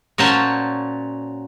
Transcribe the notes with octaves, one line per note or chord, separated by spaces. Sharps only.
A#2 F#3 C#4 C5 A5